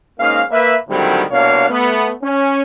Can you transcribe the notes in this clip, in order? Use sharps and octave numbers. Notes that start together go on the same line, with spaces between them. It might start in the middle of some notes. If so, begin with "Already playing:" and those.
G#2 A#3 C#4 D#4 F5
A#3 B4 E5
A2 D3 D#3 F#3 G3 C4
C2 B2 A#3 D4 C#5 F5
A3 B3
C#4